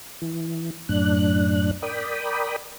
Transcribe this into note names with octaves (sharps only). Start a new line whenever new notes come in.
E3
F#2 A2 D4 F#6
A#4 D5 G5 B5 D#6